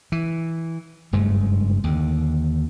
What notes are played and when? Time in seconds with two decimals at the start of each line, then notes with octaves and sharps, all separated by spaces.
0.12 E3
1.13 F#1 G2 G#3 A3
1.84 D#2 D3